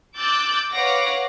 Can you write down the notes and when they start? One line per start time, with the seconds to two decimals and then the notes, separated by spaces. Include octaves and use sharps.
0.15 D6 E6 F#6 G6 A6
0.70 B4 C#5 F5 F#5 D6 A#6